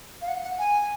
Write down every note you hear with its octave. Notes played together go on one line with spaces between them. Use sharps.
F5
F#5
F#5
G#5